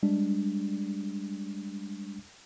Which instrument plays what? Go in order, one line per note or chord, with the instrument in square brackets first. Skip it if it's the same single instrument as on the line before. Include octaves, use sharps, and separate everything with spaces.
[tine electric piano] G3 G#3 D4